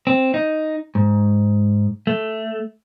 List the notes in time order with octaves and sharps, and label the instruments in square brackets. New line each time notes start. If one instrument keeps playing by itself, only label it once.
[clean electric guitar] C4
D#4
G#2
A3